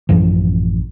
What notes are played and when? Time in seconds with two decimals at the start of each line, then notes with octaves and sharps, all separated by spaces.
0.09 A1 F#2 E3 F3